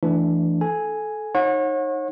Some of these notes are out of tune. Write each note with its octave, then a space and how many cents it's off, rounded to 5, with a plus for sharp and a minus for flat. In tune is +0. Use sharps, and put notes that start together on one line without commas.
E3 +20 A3 +0 D4 +0
A4 -20 G#5 +0
D#4 +0 C#5 -35 F#5 -35